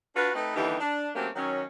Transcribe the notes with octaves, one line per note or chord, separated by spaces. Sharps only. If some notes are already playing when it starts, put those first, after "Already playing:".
D4 F4 F#4 B4
A3 C4 D#4 B4
D#2 D3 E3 G3 D#4 G4
D4
F#3 A3 A#3 C4 C#4 G4
D#3 F#3 C#4